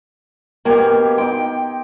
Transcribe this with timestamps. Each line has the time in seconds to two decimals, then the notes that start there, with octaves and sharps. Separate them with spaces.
0.65 G2 B2 A#3 G4 G#5
1.18 D#4 G5 C6